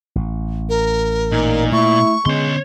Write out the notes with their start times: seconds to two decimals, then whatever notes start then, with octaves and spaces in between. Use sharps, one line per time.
0.16 A1
0.69 A#4
1.32 A#2 D#4
1.72 A3 E4 C#6
2.26 D3 G#3 B3 C#4 C#5 C6